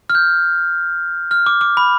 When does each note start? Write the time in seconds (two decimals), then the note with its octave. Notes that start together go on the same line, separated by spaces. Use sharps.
0.10 F6
0.15 G6
1.31 F6
1.46 D6
1.61 D6
1.77 B5